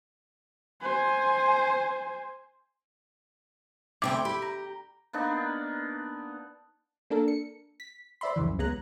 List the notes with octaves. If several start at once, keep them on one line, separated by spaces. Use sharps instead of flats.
C5 G#5
D2 C3 C4 E4 G5 D6
E4 G4
A#5
A#3 B3 D4 D#4
A#3 D4 A4 A#4
C#7
B6
C5 D5 E5 B5 C6
C2 F#2 C#3 E3
C#2 G#3 B3 A#5 F#6